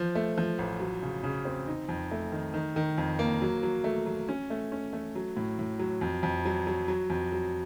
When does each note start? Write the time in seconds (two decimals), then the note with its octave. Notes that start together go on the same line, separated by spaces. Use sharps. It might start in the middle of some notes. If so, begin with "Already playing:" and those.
Already playing: F3
0.15 A3
0.38 F3
0.59 A1
0.80 F#3
1.03 C#3
1.23 C#3
1.45 C4
1.67 D#4
1.89 F2
2.11 A3
2.32 D#3
2.54 D#3
2.76 D#3
2.98 F2
3.19 A#3
3.42 F#3
3.63 F#3
3.84 A3
4.06 F#3
4.29 C#4
4.50 A3
4.72 C#4
4.93 A3
5.15 F#3
5.37 A2
5.59 A2
5.79 F#3
6.01 F2
6.23 F2
6.45 F#3
6.67 F#3
6.88 F#3
7.10 F2
7.32 F#3